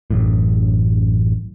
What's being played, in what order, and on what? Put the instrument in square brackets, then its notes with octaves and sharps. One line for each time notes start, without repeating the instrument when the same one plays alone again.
[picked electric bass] A1 F#2 A2